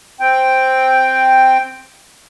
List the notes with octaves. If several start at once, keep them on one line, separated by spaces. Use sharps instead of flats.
C4 G5